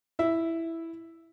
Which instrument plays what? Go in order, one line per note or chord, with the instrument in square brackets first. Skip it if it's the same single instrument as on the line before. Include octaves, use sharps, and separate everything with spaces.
[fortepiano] E4 E5